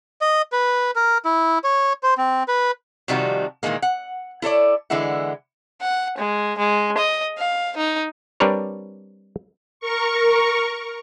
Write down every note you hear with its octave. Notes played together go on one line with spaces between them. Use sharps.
D#5
B4
A#4
E4
C#5
C5
C4
B4
C3 D#3 F3 G3 D#4 F#4
A#2 D#3 E3 G#3 A#3
F#5
E4 A4 C#5 D5
D3 E3 G#3 E4 F#5
F#5
G#3
G#3
D#5
F5
D#4
G3 C4 D4 A#4 B4 C#5
A#4 C#6